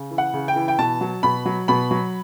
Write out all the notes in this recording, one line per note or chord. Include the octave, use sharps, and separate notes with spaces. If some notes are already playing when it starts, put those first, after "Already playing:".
Already playing: C#3
E3
F#5
C#3
G5
E3
G5
B2 A5
F#3
B2 B5
F#3
B2 B5
F#3